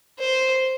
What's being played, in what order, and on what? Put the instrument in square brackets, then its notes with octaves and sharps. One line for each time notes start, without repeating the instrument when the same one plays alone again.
[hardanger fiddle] C5